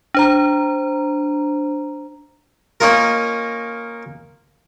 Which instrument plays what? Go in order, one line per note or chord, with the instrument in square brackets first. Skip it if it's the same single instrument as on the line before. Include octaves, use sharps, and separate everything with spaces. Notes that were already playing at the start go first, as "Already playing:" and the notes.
[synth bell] D4 C5 A#5
[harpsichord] A#3 C#4 D#4 F4 A#4